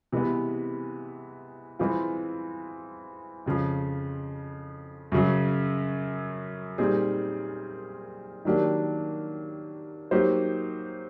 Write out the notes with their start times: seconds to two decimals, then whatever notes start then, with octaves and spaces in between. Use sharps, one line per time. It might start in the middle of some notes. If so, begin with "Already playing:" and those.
0.12 C3 E3 G#3 B3
1.79 E3 G#3 C4 F4
3.46 F2 C#3 F3
5.12 F#2 C#3 F#3
6.78 A#2 G3 C4 D#4 G#4
8.45 D#3 F#3 A#3 D4 G4
10.11 F#3 A#3 D#4 G4 C5